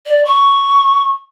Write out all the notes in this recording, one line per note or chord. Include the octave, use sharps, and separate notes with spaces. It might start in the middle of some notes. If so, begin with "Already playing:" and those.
D5
C#6